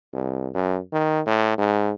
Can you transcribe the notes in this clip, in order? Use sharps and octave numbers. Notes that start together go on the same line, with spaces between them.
C2
F#2
D#3
A2
G#2